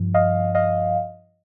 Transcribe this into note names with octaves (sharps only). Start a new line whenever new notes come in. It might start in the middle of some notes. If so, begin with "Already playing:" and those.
Already playing: G2 F3
D#5 F5
D#5 F5